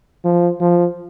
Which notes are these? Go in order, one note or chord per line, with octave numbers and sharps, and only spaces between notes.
F3
F3